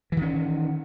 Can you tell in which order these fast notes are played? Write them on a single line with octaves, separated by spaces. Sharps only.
E3 D#3 C#4